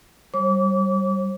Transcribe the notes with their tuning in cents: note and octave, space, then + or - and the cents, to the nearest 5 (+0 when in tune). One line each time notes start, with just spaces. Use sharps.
G3 -20 C5 +45 D6 -35